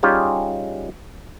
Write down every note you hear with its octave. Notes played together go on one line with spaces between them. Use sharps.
G3 C#4 D#4 F4 G4 G#4